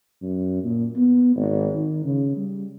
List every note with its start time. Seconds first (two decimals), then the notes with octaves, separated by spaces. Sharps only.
0.22 F#2
0.64 A#2
0.96 B3
1.36 G#1
1.74 D#3
2.05 C#3
2.36 G3